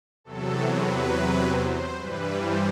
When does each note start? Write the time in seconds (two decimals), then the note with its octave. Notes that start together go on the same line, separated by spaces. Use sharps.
0.24 E2 C3 F#3 A4
0.68 B4
1.54 C5
1.97 G2 E3 G3 B4
2.40 C5